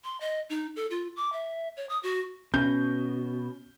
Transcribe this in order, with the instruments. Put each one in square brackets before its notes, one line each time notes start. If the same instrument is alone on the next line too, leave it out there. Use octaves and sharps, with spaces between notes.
[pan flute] C6
D#5
D#4
A4
F4
D6
E5
C#5
D#6
F#4
[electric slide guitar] B2 [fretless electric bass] C#4 [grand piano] G6